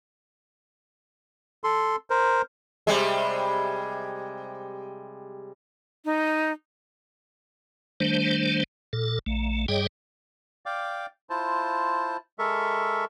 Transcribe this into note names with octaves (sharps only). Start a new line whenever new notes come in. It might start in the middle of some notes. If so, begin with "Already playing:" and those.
A4 C6
A#4 C5
C3 G3 G#3
D#4
D#3 G3 A3 D4 C5
A#2 A4
A#1 A3
G2 G3 G#4 C#5 D#5 G5
D5 F5 G5 D6
E4 F4 C5 A5
G#3 A4 A#4 E5 C#6